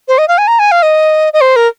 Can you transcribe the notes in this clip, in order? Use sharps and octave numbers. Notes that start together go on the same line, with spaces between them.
C5
D#5
F5
G#5
A#5
G#5
F5
D#5
D#5
C5
A#4